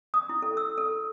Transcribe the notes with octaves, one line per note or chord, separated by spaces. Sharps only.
D#6
E4
A4
E6
A4